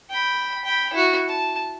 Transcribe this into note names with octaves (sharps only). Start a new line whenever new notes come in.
G5 B5
G5 B5
E4 F#4
A5